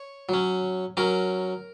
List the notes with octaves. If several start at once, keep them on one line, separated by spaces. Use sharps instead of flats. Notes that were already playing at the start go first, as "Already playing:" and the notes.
Already playing: C#5
F#3 C#4
F#3 C#4 A#4